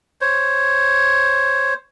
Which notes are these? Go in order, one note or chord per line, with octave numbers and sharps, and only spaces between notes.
C5 C#5